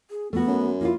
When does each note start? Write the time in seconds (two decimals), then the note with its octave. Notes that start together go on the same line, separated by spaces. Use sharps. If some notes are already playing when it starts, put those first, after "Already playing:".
0.10 G#4
0.33 A3 B3 F#4
0.47 F#2
0.81 A#3 E4 F4